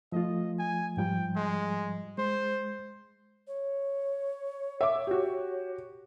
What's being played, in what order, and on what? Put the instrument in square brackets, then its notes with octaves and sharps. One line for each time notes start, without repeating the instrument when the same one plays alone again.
[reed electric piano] F3 A3 F4 [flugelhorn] D#5
[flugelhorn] G#5
[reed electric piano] G#2 F3 G3 [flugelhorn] G5
[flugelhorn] G#3
[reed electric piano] G#3 [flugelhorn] C5
[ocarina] C#5
[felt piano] E5 D6
F#4 G4